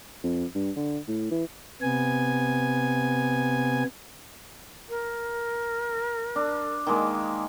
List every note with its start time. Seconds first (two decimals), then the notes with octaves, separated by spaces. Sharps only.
0.24 F2
0.55 G2
0.77 D3
1.08 A2
1.31 E3
1.82 C3 B3 G#5
4.89 A#4
6.36 D4
6.87 D#3 G#3 A#3